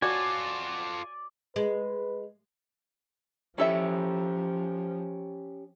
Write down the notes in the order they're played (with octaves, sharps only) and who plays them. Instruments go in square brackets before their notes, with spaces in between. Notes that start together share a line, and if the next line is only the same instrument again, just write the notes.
[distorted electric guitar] F4 A4 [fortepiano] F#4 [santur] D5 [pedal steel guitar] G#5
[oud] G#3 [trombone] B4
[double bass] F3 [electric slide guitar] C#4 G4 [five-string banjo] E4 A4 E5